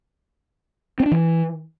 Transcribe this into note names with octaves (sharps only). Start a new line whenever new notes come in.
C4
D4
E3